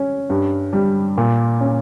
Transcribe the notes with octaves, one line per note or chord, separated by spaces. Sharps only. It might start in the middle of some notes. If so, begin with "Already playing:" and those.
Already playing: C#4
G2
G3
A#2
C#4